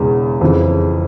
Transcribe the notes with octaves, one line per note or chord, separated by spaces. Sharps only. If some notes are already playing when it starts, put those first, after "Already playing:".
Already playing: E1 E2 C#3
F2 C#3 E3